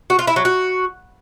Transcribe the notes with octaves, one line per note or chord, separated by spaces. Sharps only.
F#4
F4
E4
F#3
F#4